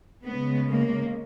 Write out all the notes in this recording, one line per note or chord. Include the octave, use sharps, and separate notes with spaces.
C#3 G#3 B3
A#3